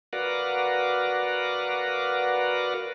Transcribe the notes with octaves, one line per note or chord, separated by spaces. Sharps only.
F#4 A#4 B4 D5 F5 F#5